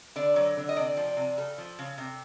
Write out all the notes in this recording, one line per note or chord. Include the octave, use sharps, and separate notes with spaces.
D3 D5
F#3
D3
D#5
C3 D5
F3
D5
C3
C#3 A4
F3
C#3
C3